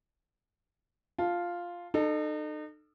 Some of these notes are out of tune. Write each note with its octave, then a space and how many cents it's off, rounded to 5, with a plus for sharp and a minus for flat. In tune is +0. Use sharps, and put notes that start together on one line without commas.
F4 +0 A5 -10
D#4 -35 A4 +0